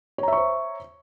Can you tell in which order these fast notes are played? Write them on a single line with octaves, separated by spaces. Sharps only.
C#5 A#5 E5 C#6 C5